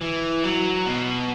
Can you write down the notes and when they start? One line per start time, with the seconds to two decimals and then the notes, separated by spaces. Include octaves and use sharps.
0.01 E3
0.44 F#3
0.86 B2